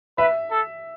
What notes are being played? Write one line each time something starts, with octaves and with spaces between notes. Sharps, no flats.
B4 E5
A4